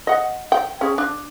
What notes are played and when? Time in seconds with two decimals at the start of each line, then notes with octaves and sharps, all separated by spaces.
0.07 D#5 F#5
0.52 G5
0.81 C#4 G#4
0.98 D4